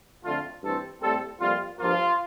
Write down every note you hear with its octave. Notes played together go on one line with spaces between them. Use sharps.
F2 D3 A3 F4
G2 E3 A3 C4 A4
A2 G3 C4 A4
F2 C3 G3 A#3 F4
G2 F3 A#3 F4